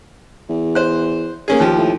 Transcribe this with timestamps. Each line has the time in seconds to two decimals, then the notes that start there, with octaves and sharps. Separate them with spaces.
0.49 E2
0.75 C5 F#6
1.48 A#3 C#4 G#4
1.60 D#2 F3 G4
1.77 A2